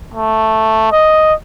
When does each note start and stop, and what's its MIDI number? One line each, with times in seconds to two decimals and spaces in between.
0.14 0.91 57
0.92 1.34 75